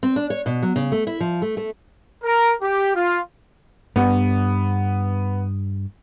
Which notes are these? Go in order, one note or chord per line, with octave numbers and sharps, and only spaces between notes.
C4
D4
C#5
B2
F#3
C#3
A3
E4
F3
A3
A3
A#4
G4
F4
G2 B3